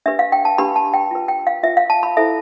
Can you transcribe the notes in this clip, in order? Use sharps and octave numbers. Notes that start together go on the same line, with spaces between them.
D4 G4 B4 E5
F5
G5
A5
D4 G4 B4 B5
A5
G5
F4 B4
G5
F5
F4 B4 E5
F5
A5
B5
E4 A4 C5 E5